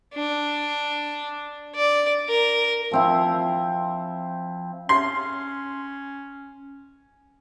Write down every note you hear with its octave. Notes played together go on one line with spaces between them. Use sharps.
D4
D5
A#4
F3 C4 E4
C#4 C6